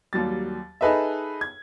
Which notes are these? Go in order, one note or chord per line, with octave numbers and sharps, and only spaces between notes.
D#2 F#3 G3 A6
D#4 G#4 A4 B4 D#5 E5
G#6